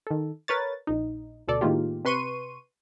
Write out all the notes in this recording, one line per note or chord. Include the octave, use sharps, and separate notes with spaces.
D#3 A4
A#4 B4 C#5 A6
A#1 D#4
D2 B2 A4 D5
A2 D#3 G#3 A#3 F4 G4
C3 B4 C6 C#6 D#7